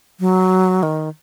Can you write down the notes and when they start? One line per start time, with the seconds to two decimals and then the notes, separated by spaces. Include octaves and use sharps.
0.20 F#3
0.83 D#3